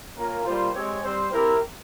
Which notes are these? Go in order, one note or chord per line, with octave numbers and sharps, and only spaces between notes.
A#3 C#4 F4 A#4
G3 A#3 F4 C5
G#3 C4 G4 C#5
G3 C4 G4 C5
C4 E4 G4 A#4